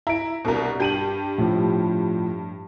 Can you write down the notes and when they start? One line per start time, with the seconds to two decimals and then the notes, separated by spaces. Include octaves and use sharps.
0.07 E4 A#5 D7
0.45 C2 B2 D4 A#4 A#5
0.80 G2 G4 G6 D#7 F#7
1.38 A2 F3